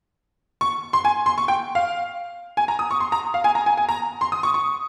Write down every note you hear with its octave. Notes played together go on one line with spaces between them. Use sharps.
C#6
C6
G#5
C6
C#6
G5
F5
G#5
A#5
D#6
C#6
C6
A#5
F5
G#5
A#5
G#5
G#5
A#5
C6
D#6
C#6
C#6